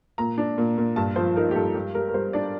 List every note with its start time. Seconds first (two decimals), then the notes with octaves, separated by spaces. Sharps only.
0.18 A#2 A#5
0.38 D4
0.58 A#2
0.78 A#2
0.96 G2 A5
1.16 F3 C5
1.36 D#4 A#4
1.51 G4
1.56 G2 A4
1.75 G3 G4
1.95 G3 A#4
2.09 A#4
2.14 G3 C5
2.33 D4 D5